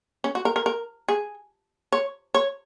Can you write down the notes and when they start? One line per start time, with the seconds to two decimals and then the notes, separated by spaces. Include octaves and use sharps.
0.24 C#4
0.35 F#4
0.45 A#4
0.56 A#4
0.66 A#4
1.08 G#4
1.92 C#5
2.34 C#5